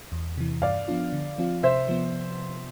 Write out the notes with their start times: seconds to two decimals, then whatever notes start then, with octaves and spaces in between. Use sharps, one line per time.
0.12 E2
0.38 C3 E3
0.62 G2 D5 F5
0.88 F3 B3 D4 F4
1.13 D3
1.38 F3 C4 F4
1.63 C3 C5 E5
1.89 F3 B3